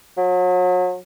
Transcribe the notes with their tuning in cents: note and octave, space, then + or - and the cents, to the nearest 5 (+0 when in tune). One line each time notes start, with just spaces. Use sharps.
F#3 -35